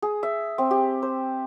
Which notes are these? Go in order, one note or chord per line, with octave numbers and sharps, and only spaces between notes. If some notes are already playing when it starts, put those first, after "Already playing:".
G#4
E5
C4
G4
C5